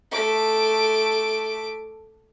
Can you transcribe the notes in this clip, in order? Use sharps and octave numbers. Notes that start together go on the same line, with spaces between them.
A3 D6